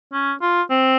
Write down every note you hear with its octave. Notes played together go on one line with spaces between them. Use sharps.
C#4
F4
C4